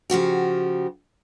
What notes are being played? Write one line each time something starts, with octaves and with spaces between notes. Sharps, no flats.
C#3 F3 F#4 G4